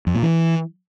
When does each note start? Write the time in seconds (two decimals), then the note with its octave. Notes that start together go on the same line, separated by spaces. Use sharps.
0.07 F2
0.15 A#2
0.22 E3